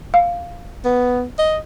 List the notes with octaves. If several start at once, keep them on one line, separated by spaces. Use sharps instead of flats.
F5
B3
D#5